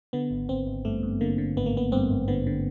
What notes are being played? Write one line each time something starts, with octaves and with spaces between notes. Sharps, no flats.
D3 B3
G#1
G#1 C4
G#1
G2 A3
G2
D3 A#3
D3
G#1 B3
A#3
G#1 B3
G2 C4
G#1
D3 B3
D3